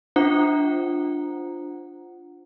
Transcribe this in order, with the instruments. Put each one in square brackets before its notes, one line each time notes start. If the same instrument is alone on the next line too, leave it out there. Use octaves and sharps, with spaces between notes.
[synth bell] D4 F4 C5 F#5 A#5